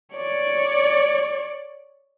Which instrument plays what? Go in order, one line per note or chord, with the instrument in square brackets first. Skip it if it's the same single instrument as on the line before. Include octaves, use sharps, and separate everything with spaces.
[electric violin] C#5 D5